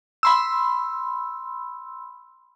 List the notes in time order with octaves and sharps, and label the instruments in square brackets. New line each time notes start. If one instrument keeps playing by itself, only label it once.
[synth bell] B5 C6 E6